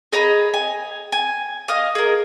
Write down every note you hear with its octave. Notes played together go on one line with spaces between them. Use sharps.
G#4 D#5 A#5 B5
G#5
G#5
D#5 F5 D#6
G#4 A#4